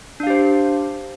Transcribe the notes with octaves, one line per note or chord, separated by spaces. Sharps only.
D4 G4 C5 F5